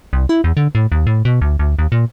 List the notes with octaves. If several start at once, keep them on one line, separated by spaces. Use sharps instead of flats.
C2
E4
E2
D3
A2
D#2
A2
B2
D2
D2
D#2
A#2